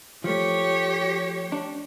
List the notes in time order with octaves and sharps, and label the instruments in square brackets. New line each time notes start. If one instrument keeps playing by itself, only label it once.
[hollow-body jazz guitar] F3 A3 [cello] G4 C#5
[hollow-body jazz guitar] D4